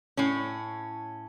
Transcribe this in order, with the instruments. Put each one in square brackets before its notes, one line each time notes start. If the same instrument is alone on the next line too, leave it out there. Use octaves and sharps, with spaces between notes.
[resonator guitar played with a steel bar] A2 C#4